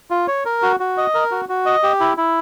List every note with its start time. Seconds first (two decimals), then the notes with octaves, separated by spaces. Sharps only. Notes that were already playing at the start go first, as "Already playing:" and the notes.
0.11 F4
0.28 C#5
0.45 A#4
0.62 F#4
0.80 F#4
0.97 D#5
1.14 A#4
1.31 F#4
1.49 F#4
1.66 D#5
1.83 G4
2.00 E4
2.17 E4